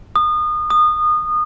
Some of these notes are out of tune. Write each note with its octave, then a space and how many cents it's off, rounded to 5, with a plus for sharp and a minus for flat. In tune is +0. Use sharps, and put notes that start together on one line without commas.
D#6 -30
D#6 -25